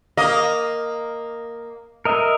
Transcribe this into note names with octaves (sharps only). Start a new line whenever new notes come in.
A#3 D#5
A#4 D#5 E5